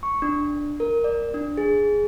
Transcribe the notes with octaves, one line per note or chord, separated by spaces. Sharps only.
C#6
D4
A#4
D5
D4
G#4